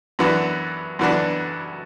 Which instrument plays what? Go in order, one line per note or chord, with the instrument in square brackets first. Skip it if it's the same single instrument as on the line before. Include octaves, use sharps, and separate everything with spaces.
[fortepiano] F#2 E3 B3 D4
F#2 E3 B3 D4